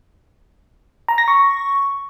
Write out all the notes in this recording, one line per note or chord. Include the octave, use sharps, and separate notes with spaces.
A#5
A#6
C#6